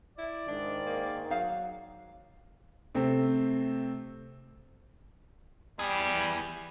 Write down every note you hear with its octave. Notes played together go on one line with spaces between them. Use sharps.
E4 D5
G#2 D#3 D4
A#3
F#3 D#4 F5
C3 A3 C4
E3 G3 G#4